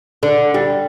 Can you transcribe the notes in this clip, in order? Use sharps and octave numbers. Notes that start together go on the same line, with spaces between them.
D3
G3